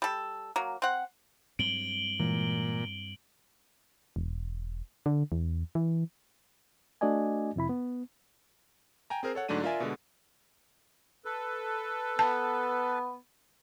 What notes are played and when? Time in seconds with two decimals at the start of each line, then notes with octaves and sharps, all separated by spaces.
0.02 G3 A4
0.56 F#3 A#3
0.82 C4 F#5
1.59 G2 F#3 C4 D7 F#7 G7
2.20 A#2 E3 G#3
4.16 E1
5.06 D3
5.32 E2
5.75 E3
7.01 A3 D4 F#4 D5 D#5 G#5
7.56 F2 C3 E4 B5
7.69 B3
9.10 G5 G#5 A#5
9.23 C4 G#4 A#4 C5
9.35 A4 C#5 F#5
9.48 G#2 D3 F#3 A3 D4 D#7
9.64 F4 A#4 D5 E5 G#5
9.80 B2 D3 G#3
11.25 A4 B4
12.19 B3 A5